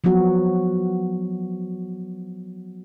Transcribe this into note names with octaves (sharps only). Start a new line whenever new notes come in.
F3 F#3 B3 F#4